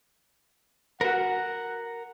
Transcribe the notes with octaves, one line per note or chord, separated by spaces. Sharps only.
F#4 A#4 B4 F#5